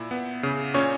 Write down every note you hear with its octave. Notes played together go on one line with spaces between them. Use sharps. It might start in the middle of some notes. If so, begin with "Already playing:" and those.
Already playing: A#2 E4
B3
C#3
A#2 C#4 C#5